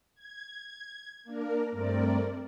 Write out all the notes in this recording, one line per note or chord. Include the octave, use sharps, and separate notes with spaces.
G#6
A#3 D4 A#4
G2 A3 C4 A#4 D5